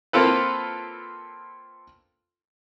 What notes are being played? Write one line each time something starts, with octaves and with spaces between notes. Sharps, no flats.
A#3 C4 F4 A4 B4